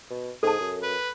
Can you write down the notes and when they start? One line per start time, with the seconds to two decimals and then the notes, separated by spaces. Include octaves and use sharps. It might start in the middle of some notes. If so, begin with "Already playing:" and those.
0.10 B2
0.43 G#2 G#4 A4 A5
0.60 F#2
0.83 B4